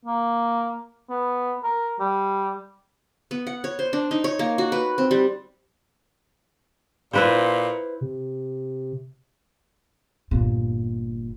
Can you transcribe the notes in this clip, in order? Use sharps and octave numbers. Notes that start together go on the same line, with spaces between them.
A#3
B3
A#4
G3
B3
F#5
C#5
C5
D4
D#4
C#5
A#3
F#4
B4
C4
G3
A#2 E4 B4 C5
C3
G1 A#2